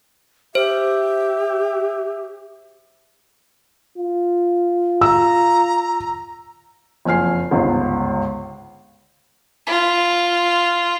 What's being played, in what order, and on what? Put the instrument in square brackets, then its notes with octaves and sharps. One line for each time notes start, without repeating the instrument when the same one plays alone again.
[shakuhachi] G4 [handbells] C5 [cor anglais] E5
[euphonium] F4
[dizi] A#5 [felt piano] E6
[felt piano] F#1 F2 G#5 F6 C7
G1 C#2 G#2
[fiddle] F4